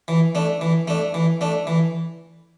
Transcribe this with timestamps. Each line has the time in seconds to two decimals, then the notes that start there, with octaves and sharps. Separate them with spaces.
0.08 E3
0.35 A3 D4
0.61 E3
0.88 A3 D4
1.14 E3
1.41 A3 D4
1.67 E3